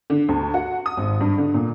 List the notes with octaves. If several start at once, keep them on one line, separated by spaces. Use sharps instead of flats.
D3
D2
F#4
D#6
G#1
G2
D3
A#2